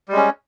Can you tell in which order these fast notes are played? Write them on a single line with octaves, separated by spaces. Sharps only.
G3 G#3 C#4